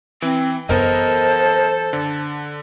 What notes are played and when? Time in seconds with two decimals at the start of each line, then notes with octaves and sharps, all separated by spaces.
0.22 E3 C4
0.69 F#2 E3 B3 A4 A#4 C5 D#5
1.93 D3